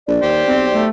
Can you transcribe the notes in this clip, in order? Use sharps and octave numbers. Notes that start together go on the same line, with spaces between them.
A#1 D5
D#2 G4 C5
B1 C4
A3